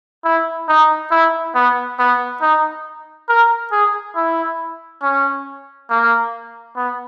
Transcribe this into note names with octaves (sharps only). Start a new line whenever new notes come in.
E4
D#4
E4
B3
B3
D#4
A#4
G#4
E4
C#4
A#3
B3